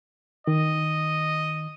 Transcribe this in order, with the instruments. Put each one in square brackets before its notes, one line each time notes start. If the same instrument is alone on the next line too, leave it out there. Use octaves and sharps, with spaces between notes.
[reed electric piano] D#3 [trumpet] D#5